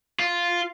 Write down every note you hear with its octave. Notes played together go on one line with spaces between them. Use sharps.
F4